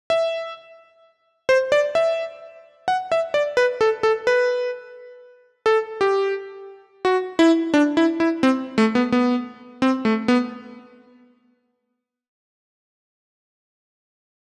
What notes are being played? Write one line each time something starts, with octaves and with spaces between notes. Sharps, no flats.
E5
C5
D5
E5
F#5
E5
D5
B4
A4
A4
B4
A4
G4
F#4
E4
D4
E4
E4
C4
A3
B3
B3
C4
A3
B3